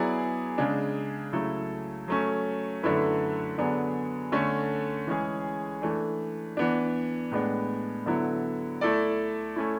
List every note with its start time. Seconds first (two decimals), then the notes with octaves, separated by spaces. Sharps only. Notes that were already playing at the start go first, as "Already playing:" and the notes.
Already playing: F#3 B3 E4 G#4 D5
0.58 C#3 G#3 D4
1.33 C#3 F#3 A3 E4 A4
2.08 F#3 A3 C#4
2.83 F#2 D3 A3 E4 B4
3.58 D3 F#3 B3 D4 G#4
4.32 D3 A3 C#4
5.07 E3 G#3 C#4 G#4
5.82 E3 A3 D4
6.57 E3 B3 D4
7.32 A2 G#3 B3 D4
8.06 D3 F#3 B3 E4
8.81 A3 E4 A4 D5
9.56 A3 C#4 E4